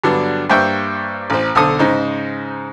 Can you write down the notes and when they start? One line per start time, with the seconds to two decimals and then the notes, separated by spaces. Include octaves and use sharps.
0.04 G2 D3 F#3 B3 D4
0.50 G2 A#3 C5 E5 G5 C#6
1.30 A1 C5
1.55 B1 D3 A4 C5 D#6
1.79 G#2 C#3 D#4 C5